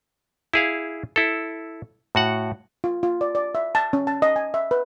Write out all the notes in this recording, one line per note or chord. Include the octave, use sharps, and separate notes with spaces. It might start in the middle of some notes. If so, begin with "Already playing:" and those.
E4 G#4 F5
E4 A4
A2 F#4 F#5
F4
F4
D5
D5
E5
A5
C#4
A5
D#5
G#5
E5
B4